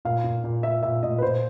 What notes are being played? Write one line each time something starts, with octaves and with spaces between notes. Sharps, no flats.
A#2 F5
A#2
A#2
A#2 E5
A#2 E5
A#2 D#5
B4
A#2 C5